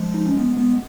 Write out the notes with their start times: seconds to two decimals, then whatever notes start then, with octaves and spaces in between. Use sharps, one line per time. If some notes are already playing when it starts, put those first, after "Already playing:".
Already playing: F3 G#3
0.14 D#4
0.26 C#4
0.37 G#3 B3
0.57 G#3 B3